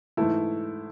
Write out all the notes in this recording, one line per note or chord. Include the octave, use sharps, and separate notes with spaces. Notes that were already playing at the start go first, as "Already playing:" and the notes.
G#2 E3 A3 E4